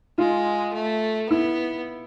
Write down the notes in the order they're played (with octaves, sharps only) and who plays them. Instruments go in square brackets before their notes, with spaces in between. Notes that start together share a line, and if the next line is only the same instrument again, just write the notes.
[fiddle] G#3 [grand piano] F4
[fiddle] A3
[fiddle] B3 [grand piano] E4